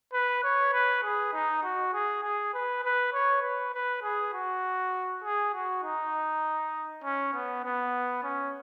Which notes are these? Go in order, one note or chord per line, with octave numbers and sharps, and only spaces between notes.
B4
C#5
B4
G#4
D#4
F#4
G#4
G#4
B4
B4
C#5
B4
B4
G#4
F#4
G#4
F#4
D#4
C#4
B3
B3
C#4